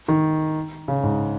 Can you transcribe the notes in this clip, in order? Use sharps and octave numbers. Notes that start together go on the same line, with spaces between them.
D#3
C#3
G#2